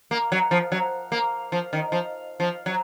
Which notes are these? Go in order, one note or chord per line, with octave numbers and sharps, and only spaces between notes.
A#3
F#3
F3
F#3
A#3
F3
D#3
F3
F3
F#3